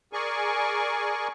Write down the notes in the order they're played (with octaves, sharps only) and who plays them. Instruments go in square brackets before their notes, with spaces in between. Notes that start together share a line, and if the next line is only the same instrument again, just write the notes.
[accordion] G#4 A#4 D5 G#5 C#6